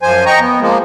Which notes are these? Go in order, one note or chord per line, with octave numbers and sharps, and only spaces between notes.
F#2 F3 C5 G#5
D#5 G5 A#5 C#6
B3
F3 G#3 A#3